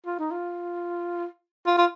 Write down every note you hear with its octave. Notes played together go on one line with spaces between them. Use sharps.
F4
D#4
F4
F4
F4